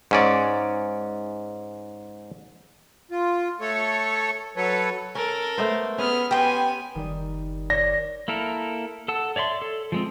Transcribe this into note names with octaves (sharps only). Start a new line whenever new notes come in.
G#2 C#4 D5
F4
A3 A4 C#5
F#3 A4 B4 C#5
C#4 A4 A#4
A3 B3 C5
B3 C#4 G#4 F6
B3 G4 G5 G#5 C6
F#1 D#3 G3
C#5 D5 A#6
A#3 E4 A4 A#4
A4 F#5 A5 E6
C#5 D5 E5 C6
A4
F3 G#3 C4